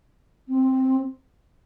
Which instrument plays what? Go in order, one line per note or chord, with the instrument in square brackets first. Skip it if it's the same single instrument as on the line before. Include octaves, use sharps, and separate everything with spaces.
[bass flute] C4